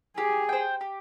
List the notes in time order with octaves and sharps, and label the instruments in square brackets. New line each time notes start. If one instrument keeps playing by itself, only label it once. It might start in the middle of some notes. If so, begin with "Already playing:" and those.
[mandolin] G4 [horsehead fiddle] G#4
[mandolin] C5 G5
G4